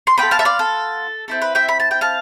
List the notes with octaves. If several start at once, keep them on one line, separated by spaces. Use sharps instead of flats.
C6
B3 F4 A4 G5 B5
F5 A5
E5
D5 F5
A4
C4 E4 A4
B4
E5 G5
B5
A5
G5
F5 A5